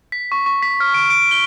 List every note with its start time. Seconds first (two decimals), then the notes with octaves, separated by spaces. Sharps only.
0.12 B6
0.32 C#6
0.46 C#6
0.63 B6
0.80 F6
0.94 D7
1.10 D7
1.31 G7